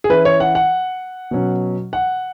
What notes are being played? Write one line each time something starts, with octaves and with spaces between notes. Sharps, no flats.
G#4
E3 C#4 E4 B4
C#5
F#5
F#5
B2 F#3 C#4
F#5